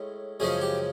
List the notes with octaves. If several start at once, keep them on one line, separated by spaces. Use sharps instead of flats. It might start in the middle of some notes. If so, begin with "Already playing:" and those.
Already playing: A2 G#3 C#4
F#2 C#3 F3 G#3 C#4 G#4
G4